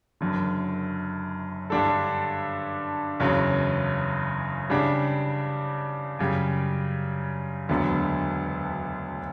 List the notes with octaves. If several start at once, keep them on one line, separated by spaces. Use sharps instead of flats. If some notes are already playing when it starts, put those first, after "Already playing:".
F#1 F#2 D3
G2 D3 G3 D4 A4
F#1 E2 C#3 F#3 C#4
C#3 G3 D4
F#2 C#3 G3
E1 D2 D3 F#3 B3